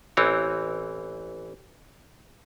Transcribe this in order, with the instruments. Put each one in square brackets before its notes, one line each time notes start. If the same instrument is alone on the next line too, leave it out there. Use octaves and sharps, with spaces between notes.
[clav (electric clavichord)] A1 E3 C4 C#5